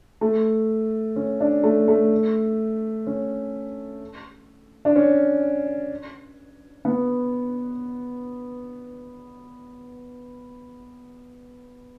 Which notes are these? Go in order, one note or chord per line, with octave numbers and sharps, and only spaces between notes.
A3
C#4
D4
A3
A3
C#4
D4
C#4
B3